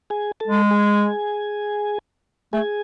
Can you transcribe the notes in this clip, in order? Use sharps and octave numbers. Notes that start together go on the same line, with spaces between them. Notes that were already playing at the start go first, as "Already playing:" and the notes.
G#4 G#5
A4 A5
G#3
G#4 G#5
A3 G#4 G#5